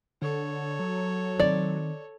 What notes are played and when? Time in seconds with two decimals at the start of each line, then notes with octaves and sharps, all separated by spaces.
0.22 D3 A4 C#5
0.79 F#3
1.40 D#3 C4 D5